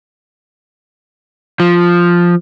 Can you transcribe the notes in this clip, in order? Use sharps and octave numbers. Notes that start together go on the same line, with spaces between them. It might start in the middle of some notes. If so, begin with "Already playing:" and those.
F3